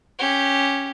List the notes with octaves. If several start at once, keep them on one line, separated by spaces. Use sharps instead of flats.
C#4 G4